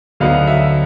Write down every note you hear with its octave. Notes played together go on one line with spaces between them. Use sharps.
D2 D3 F#3 B3 D#4 F5
E5